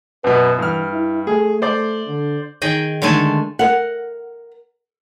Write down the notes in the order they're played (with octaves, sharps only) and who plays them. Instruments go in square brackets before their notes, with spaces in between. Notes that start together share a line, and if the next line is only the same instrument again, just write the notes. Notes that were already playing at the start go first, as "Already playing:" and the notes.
[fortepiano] F#2 B2 [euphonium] B4
[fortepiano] G2 F6 [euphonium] E3
[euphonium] E4
[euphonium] A3 [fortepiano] G#4
[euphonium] A3 [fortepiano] C5 D5
[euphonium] D3
[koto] D#3 G#4 D#5 G5
D3 D#3 G#3 A3 A4 G#5
[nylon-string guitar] A#4 F#5